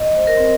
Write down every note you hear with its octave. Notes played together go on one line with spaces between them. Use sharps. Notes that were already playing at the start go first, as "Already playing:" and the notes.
Already playing: D#5
C5
A#4
C4